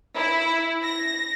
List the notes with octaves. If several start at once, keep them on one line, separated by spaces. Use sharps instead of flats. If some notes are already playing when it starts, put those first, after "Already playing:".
E4
A#6